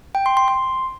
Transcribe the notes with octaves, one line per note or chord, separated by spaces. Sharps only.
G5
C6
C6
C6